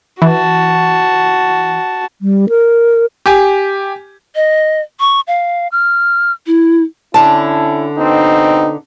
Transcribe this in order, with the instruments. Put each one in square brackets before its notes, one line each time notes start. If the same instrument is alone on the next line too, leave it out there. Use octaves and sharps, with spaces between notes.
[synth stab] E3 [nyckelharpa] F#4 A5
[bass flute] G3
A#4
[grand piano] G4 G#5
[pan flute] D#5
C#6
F5
F6
E4
[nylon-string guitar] D3 A5 [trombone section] C#4 E4
[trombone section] B2 C4 [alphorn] D#4